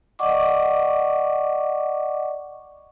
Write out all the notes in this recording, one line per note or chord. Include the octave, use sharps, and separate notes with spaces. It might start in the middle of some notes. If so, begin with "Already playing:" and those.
D5 D#5 F#5 C#6 D6